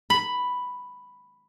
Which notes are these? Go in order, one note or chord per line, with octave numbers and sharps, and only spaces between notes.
B5